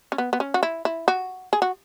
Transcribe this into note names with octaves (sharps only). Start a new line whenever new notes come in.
C#4
B3
B3
C#4
F#4
E4
E4
F#4
G#4
F#4